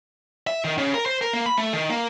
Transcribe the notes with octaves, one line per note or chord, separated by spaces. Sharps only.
E5
D#3
C#3
A#4
C5
A#4
A#3
B5
A3
D#3
A#3